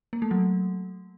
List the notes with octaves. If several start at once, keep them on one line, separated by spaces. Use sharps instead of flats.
A#3
A3
F#3